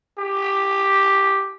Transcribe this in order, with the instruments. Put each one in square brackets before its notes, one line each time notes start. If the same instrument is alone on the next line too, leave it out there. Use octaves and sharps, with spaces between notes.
[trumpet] G4